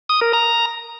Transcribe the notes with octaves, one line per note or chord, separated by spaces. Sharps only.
D#6
A#4
A#5